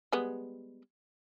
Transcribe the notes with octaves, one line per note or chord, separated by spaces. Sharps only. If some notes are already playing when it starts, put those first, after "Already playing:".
G3 G#3 B3